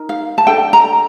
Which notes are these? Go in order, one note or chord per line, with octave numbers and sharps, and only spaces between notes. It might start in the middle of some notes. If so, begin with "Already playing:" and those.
Already playing: D#4 A#4
F5
A5
D4 A4 G5
A#5